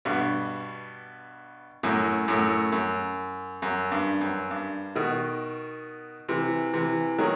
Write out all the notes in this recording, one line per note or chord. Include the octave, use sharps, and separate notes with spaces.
G2 B2
F#2 A2
F#2 A2
F#2
F#2
G2
F#2
G2
B2 D#3
C3 E3
C3 E3
D#3 F#3